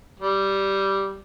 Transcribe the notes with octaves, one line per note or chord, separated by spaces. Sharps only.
G3